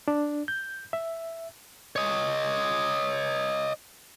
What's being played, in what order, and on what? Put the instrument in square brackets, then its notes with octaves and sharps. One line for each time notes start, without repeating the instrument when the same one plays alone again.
[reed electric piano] D4
G6
E5
[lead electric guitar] C#5 D#5